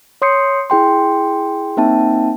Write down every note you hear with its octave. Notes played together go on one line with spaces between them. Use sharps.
C#5 C6 D#6 G6 C7 C#7
E4 G#4 G5 C6
A#3 C4 D#4 E5 G5 A5